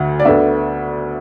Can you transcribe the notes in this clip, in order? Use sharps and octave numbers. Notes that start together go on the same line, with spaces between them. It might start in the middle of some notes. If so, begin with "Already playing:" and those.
Already playing: D2 D3
D5
D2 D3 B3 D4 E5